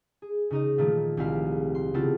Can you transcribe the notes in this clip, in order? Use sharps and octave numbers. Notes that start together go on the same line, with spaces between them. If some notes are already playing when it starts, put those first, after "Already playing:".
G#4
C#3 D#4 D#5
A#2 D#3 F3 A3 A#3
C2 G#3 C4 E4 F5
C6
C#3 B3 C4 E4 F4 A4